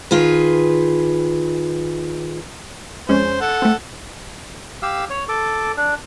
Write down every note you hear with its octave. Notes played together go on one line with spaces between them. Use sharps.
D#3 F4 G#4 B4
F2 G#3 C#4 C5
A4 F#5
A3 C4
G4 F5 E6
C#5
A4 D6
D4